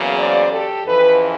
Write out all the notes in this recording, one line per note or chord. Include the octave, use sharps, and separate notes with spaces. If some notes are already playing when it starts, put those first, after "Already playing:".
Already playing: E2 C#3 F#3 A#3
C5 D5
G4 A4
F2 C#3 E3 A4 B4